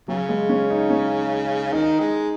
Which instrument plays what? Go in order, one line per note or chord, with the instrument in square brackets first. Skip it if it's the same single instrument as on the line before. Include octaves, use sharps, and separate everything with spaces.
[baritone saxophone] C#3 [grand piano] F#3
[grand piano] G#3
C#4
D#4
C#4
[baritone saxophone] D#3 [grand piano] D#4
[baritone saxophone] G#3